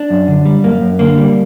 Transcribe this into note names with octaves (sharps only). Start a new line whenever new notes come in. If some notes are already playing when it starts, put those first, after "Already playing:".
Already playing: D4
F#2
D3
G3
F#2 A#3
F#2
D3 A#3
G3